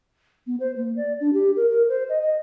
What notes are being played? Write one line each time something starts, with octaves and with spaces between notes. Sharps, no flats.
B3
C5
A#3
D5
D4
G4
A#4
A#4
C5
D#5
D#5